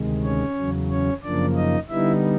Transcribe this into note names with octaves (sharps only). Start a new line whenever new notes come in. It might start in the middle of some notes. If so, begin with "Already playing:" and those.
Already playing: D2 C3 D#3 G#3
C#4 C#5
E2 C#3 F#3
C#4 C#5
F#2 C#3 F3 A#3 D4 D5
D#4 D#5
D3 G3 B3 D#4 E4 E5